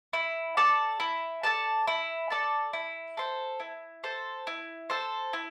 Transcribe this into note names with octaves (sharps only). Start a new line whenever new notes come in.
E4
A4 D5 A5
E4
A4 D5 A5
E4
A4 D5 A5
E4
A4 C5
E4
A4 C5
E4
A4 C5
E4